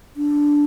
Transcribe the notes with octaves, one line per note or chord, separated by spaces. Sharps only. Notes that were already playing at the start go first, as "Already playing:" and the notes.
D4